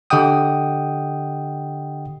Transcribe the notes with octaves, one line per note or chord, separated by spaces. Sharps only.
D3 G4 D#5 F#5 G5 D#6